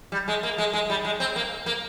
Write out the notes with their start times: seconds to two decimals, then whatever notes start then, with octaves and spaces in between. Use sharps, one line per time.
0.12 G3
0.28 G#3
0.43 A#3
0.58 G#3
0.73 G#3
0.90 G3
1.05 G#3
1.20 C4
1.36 A#3
1.66 A#3